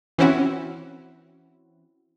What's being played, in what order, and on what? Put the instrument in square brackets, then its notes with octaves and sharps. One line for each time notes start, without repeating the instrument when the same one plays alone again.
[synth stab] E3 C4 C#4 E4 F#4